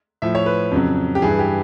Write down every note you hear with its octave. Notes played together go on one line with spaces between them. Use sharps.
A2 F3 E5
C#5
B4
F2 C#3 F#3
G4
G2 E3 G#4
G4